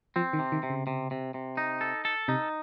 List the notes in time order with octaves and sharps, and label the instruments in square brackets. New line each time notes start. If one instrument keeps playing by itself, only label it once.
[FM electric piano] F3 [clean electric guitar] C4
[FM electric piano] D#3
[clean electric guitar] C3
[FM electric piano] D#3
[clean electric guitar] C3
[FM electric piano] C#3
[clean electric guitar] C3
C3
C3
D#4
A4
A4
[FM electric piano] C3 [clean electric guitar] D#4